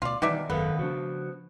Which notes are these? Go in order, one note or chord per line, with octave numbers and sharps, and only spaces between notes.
D2 B2 F4 D5
B2 D#3 E3 G3 D#4 D5 E5
G#1 F#2 D#3 B3 A4 F5
C#3 F3 D4 F#4 C5